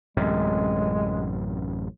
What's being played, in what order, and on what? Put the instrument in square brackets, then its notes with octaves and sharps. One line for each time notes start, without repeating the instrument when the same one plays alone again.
[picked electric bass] A1 F#2 C3 [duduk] G#3